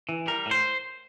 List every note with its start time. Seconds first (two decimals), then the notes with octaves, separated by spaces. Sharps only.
0.09 E3
0.27 G3 A#4
0.46 A2
0.51 C5